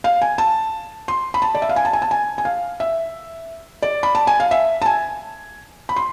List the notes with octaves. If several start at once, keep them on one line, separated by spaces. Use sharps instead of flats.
F5
G#5
A5
C6
B5
A5
D5
E5
F5
G#5
A5
G#5
A5
G#5
G#5
F5
E5
D5
B5
A5
G#5
F5
E5
A5
G#5
B5
C6